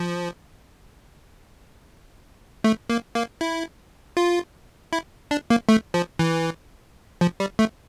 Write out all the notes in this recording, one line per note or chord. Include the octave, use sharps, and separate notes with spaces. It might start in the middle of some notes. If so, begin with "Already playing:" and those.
Already playing: F3
A3
A#3
A#3
E4
F4
E4
D4
A#3
A3
F3
E3
F3
G3
A3